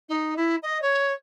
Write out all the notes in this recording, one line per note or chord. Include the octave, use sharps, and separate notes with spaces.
D#4
E4
D#5
C#5